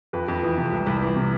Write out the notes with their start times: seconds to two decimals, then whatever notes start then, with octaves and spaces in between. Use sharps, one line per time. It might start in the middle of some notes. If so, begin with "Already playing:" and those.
0.13 F2 B4
0.28 F2
0.43 E3
0.57 C3
0.72 C2
0.87 C2
1.02 E3
1.16 C3